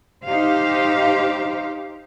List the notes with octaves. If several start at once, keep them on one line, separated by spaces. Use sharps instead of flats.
D#4 G4 C5 F5